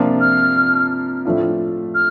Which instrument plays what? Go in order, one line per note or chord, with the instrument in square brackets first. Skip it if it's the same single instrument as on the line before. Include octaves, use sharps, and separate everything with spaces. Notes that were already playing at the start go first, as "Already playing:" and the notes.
Already playing: [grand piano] C3 F3 A#3 D4 F4
[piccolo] F6
[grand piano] A2 F3 A3 D4 F4
[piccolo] F6